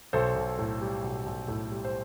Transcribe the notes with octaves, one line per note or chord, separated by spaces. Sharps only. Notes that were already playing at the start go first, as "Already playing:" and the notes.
B1 A4 C5
B1
A2
G3
B1
B1
A2
G3
C5